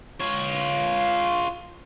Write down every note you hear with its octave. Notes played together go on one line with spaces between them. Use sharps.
F4 C#5